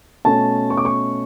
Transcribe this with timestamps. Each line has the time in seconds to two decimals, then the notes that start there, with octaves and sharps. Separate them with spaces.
0.25 B2 A3 C#4 A5
0.70 C#6
0.77 D6
0.85 C#6